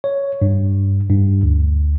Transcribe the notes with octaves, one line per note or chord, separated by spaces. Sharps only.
C#5
G2
G2
D2